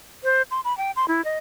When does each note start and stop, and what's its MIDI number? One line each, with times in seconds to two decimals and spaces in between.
0.24 0.42 72
0.51 0.61 84
0.65 0.76 83
0.78 0.91 79
0.96 1.06 84
1.08 1.24 64
1.25 1.38 75